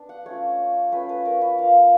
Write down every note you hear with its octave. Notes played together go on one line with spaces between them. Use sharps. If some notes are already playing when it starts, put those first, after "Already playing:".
Already playing: B3 D4
F#5
A3 C#4 F4 C#5
A3 C#4 F4 B4
B4
A#4
B4
A#3 D4 F4 F5